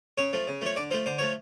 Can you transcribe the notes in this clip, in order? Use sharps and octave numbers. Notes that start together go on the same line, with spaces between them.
C#3 C#5
F3 A3
C#3
F3 A3 C#5
D3 D5
F3 A3 C5
D3 C5
F3 A3 C#5